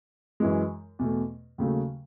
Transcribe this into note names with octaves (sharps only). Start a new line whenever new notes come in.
F#2 E3 G#3
E2 B2 A3
D#2 C#3 F#3 A3